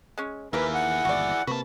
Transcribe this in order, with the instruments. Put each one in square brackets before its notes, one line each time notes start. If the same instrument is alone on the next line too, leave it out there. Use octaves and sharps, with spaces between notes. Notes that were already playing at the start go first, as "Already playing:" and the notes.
[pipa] G#3 C#4
[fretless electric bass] D#2 [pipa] A#3 A#4 F5 [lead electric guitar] E4 G#4 [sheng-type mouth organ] B4
[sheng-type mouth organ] F#5
[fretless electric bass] G1 D#2 E3 [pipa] F#4 D5
[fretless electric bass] C3 A#3 [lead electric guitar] F#4 A5 [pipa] B4